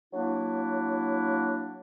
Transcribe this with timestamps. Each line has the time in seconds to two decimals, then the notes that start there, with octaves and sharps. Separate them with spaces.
0.13 F#3 A#3 D4 E4